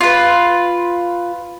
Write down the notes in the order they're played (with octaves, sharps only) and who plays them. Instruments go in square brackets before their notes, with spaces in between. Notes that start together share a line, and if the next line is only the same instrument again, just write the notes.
[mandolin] F4 B4